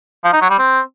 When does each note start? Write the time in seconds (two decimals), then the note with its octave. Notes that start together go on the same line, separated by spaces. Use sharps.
0.24 F3
0.33 D#4
0.41 F#3
0.50 G3
0.59 C4